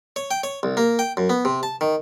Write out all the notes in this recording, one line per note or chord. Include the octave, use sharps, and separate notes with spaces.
C#5
G5
C#5
C2
A#3
G5
F#2
B3
C3
A5
D#3